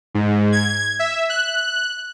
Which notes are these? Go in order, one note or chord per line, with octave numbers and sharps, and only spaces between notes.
G#2
G#6
E5
F#6